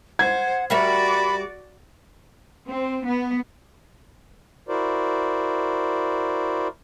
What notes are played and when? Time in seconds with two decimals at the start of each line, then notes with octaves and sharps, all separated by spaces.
0.19 C5 F#5 G#6
0.70 G3 F#4 A#4 D5 E5 B5
2.69 C4
3.06 B3
4.69 E4 F#4 A#4 C5 D5